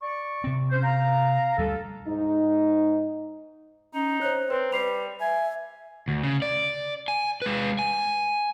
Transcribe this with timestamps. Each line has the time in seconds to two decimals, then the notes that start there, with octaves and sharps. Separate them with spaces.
0.01 D5 C#6
0.44 C3 C4
0.71 C#4 C5
0.83 F5 A#5
1.58 D2 G3 A4
2.09 G#2 D#4
3.94 C#4 D#4
4.21 C5 C#5 F#6
4.50 C4 B4 C5
4.73 G3 B4 C7 F7
5.20 E5 G#5
6.08 D2
6.23 C#3
6.42 D5
7.08 G#5
7.42 G#3 B4
7.79 G#5